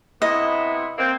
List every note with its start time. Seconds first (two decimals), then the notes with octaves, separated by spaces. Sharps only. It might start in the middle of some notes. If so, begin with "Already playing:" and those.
0.22 C3 B3 E4 D#5
0.98 A#3 C4